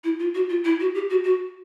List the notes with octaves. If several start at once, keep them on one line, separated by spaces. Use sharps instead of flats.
E4
F4
F#4
F4
E4
F#4
G4
F#4
F#4